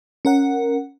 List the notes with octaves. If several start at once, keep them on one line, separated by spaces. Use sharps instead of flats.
C#4 A#4 F#5